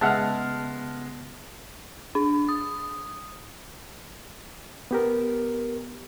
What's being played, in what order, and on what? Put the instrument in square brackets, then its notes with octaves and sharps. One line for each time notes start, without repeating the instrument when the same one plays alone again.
[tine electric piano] C#3 B3 [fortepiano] G#3 E5 F#5 [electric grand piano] A5 F6
[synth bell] D4
D#6
[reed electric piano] B3 G4 A#4